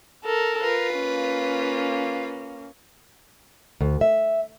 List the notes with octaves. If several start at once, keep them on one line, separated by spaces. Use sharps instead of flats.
A4 A#4
F4 A#4 B4
A#3 C#4
D2
E5